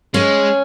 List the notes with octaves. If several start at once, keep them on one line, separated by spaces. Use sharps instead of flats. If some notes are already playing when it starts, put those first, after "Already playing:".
G#3 C#4